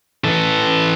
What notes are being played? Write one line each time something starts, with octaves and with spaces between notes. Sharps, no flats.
E3 A4